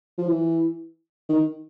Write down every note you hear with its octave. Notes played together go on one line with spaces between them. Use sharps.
F3
E3
D#3